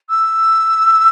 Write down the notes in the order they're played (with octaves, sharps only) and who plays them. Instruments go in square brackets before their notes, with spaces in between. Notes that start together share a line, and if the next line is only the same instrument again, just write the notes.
[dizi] E6